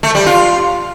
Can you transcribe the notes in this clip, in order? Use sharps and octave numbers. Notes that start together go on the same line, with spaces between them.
A3
G3
F4